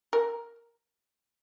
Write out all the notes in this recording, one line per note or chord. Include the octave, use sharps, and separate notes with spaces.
A#4